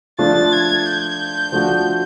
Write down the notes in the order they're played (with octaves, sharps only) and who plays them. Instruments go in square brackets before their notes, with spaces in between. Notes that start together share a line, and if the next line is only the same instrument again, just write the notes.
[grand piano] F3 A3 D4 F4 [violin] A6
[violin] G#6
G6
[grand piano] F3 A3 D4 F#4